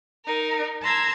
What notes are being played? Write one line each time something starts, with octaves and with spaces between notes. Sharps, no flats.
D#4 A#4
A5 A#5 C6 E6 G#6